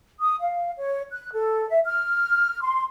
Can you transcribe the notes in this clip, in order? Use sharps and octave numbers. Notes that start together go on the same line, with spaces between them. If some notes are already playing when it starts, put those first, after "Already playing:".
D#6
F5
C#5
F#6
A4
E5
F6
C6